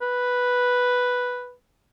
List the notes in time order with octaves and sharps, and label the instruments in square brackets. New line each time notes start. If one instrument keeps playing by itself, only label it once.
[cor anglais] B4